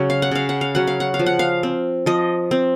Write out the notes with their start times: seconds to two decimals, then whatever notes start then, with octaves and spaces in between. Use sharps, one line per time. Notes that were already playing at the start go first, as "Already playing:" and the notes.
Already playing: C#3 F#3 C#4
0.10 F5
0.22 F#5
0.31 C#3 F5
0.49 F#5
0.61 F5
0.75 F#3 C#4 F#5
0.87 F5
1.00 F#5
1.14 F5
1.19 F3
1.26 F#5
1.39 F5
1.63 C4
2.06 F3 D#5
2.51 C4